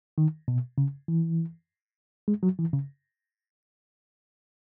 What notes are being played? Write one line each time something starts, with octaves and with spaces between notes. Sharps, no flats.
D#3
B2
C#3
E3
G#3
F#3
E3
C#3